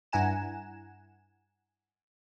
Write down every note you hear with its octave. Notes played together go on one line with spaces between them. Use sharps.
G2 E4 F#5 G#5 A#5 E7